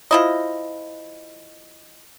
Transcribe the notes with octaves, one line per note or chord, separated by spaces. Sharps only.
F3 E4 D#5